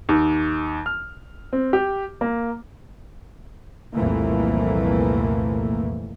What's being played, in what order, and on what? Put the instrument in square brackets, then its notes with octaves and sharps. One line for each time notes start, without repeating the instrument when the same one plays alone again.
[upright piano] D#2
F6
C4
G4
A#3
[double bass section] C2 F2 A#2 E3 A3 A#3